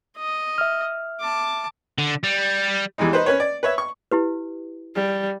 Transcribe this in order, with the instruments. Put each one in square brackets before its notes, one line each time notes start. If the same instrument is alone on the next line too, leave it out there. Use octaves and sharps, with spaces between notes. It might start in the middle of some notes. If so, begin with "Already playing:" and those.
[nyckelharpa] D#5
[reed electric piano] E5 F6
[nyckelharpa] A5 D6
[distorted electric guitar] D3
G3
[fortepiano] E2 E3 G3 G#3 D#4
D#4 B4 C5
C#4 B4 C#5
D5
B4 C#5 E5
C#6
[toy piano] E4 G4 B4
[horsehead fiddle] G3